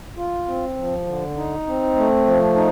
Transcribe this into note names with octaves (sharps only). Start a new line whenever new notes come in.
F4
C4
F3
D3
D#4
C4
A3
F3
D#4